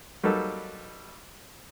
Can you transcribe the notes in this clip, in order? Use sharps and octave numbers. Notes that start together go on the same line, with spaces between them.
F#3 G3 A#3 D#4 A4 B4